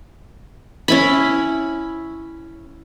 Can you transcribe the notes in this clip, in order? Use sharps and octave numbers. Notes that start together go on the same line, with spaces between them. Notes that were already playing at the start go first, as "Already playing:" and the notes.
C#4 E4 B5